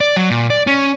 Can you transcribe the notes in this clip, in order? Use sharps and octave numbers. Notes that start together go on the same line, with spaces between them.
D5
F#3
A#2
D5
C#4